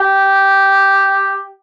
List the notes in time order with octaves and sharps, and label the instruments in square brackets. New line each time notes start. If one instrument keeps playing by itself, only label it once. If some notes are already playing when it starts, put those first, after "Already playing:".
Already playing: [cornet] G4